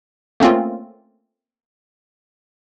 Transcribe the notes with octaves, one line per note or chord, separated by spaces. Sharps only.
A3 A#3 C4 C#4 F4